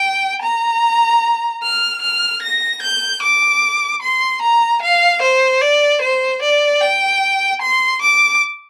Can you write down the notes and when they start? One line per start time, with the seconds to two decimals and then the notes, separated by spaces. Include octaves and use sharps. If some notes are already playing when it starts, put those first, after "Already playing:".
Already playing: G5
0.42 A#5
1.63 F6
2.02 F6
2.42 A#6
2.82 G6
3.22 D6
4.02 C6
4.42 A#5
4.82 F5
5.22 C5
5.61 D5
6.02 C5
6.42 D5
6.81 G5
7.62 C6
8.02 D6